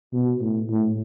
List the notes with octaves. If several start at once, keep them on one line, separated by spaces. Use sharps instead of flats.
B2
A2
A2